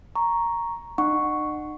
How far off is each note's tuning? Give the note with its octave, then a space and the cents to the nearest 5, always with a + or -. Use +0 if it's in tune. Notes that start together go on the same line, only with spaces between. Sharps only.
A#5 +0 C#6 +0
D#4 -45 F#5 +0 C#6 +0